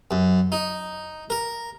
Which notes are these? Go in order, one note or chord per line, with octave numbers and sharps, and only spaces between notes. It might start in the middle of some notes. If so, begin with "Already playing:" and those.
F#2
D#4
A#4